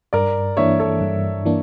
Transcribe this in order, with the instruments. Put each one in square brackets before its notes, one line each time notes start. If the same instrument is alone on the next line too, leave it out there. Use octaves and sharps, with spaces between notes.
[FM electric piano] G2 [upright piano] A#4 D5
[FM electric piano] E3 A#3 D4 [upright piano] C#5 E5
[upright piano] A4 C#5
[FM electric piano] G2
E3 A#3 D4